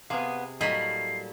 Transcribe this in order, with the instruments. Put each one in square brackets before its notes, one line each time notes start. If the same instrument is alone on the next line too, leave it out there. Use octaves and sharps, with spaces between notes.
[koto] C3 G#4 [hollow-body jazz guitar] B3 F5
[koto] A2 F#3 [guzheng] G3 A#3 B5 [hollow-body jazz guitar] D#5 [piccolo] C7